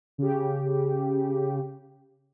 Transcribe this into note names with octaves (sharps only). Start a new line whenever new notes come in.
C#3 G4